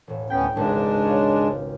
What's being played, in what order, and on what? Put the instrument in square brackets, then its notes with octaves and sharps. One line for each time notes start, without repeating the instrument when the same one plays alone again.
[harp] E1 A2
[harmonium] D2 B3 C#4 [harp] G5 B6
[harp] D#1 G#1 C#2 [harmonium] G#3 D4
[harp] F4 C#5